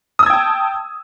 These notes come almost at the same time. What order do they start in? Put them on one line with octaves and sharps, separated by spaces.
D#6 E6 G#6 G5 A5